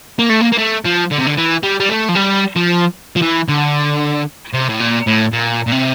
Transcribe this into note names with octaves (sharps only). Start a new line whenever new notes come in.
A#3
A3
A#3
A#3
A3
F3
D3
C3
D3
E3
G3
G3
A3
F3
G3
F3
F3
E3
D3
C3
A2
A#2
A2
A#2
A#2
C3